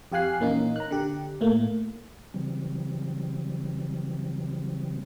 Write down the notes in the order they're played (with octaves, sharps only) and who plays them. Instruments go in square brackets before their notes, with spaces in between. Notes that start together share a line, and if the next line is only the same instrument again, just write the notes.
[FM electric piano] F2 G4 F5 G#5 F#6 C7
A#2 E3 A#3 C#4 D#4
A#5 F#6
D3 G4
A2 A3 A#3
[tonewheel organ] C#3 E3 F#3 G3 C4